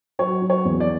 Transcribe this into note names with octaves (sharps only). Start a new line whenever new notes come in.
F#3 C#5
F#3
C#5
E2
D5